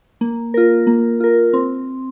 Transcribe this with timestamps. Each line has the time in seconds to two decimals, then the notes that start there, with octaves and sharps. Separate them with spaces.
0.21 A#3
0.54 F4 A#4
0.87 A#3
1.20 F4 A#4
1.53 C4